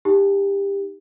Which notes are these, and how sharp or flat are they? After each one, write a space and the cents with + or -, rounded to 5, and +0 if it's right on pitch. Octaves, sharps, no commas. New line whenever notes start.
D#4 +0 G4 +20